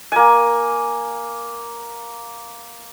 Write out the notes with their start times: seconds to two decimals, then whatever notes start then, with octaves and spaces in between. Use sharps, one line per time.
0.12 A#3 G#5